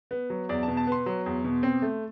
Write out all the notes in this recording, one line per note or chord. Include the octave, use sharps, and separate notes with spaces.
B3
F#3
E2 D5
A5
B2
A5
B3 C6
F#3
E2
B2
C4
A3